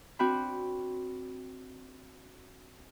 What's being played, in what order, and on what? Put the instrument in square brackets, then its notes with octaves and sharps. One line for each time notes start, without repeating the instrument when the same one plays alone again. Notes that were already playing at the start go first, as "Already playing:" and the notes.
[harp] C4 D4 F#4 G5 B5